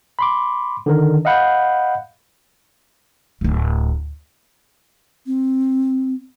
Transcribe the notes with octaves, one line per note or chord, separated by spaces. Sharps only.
B5 C6 D6
D3 D#3 A#4
D#5 F5 F#5 B5 G6
D1 G#1
C4